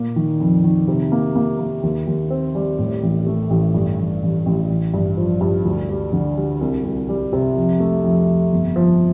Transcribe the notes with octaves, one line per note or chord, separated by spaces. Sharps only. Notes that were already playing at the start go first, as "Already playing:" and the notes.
Already playing: A#2 A#3
D#3
F2
D#3
C3
A#3
A#3
A#3
D#2
D#2
C4
G3
A2
A1
A3
A1
G2
A1
A1
A1
A1
G2
F3
G2
D2
G3
D3
G3
C2
C2
G3
C3
F2
A3
F2
F2
G1
F3